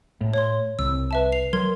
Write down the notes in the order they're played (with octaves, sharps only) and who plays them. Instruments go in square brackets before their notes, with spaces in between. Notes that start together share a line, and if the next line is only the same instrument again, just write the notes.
[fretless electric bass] A2
[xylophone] C#5 C6
[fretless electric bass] C2 [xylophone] E6
[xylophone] B4 E5 A5
C7 F7
[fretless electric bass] F#3 [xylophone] A#4 C6 G#6